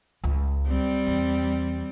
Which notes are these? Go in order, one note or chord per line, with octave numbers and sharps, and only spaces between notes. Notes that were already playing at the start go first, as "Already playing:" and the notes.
C#2
G3 C4
E2